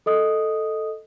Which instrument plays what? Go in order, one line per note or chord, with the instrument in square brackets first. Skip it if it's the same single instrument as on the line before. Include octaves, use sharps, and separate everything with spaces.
[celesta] A4 D#5 D#6